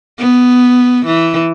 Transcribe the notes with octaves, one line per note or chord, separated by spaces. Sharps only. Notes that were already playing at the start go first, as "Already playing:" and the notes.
B3
E3